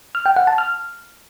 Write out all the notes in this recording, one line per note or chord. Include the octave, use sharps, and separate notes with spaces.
F6
G5
F#5
A5
F6